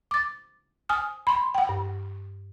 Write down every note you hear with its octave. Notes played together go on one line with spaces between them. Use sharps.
D6 A6
G#5 D#6 F6
B5 C6
F#5 G5
G2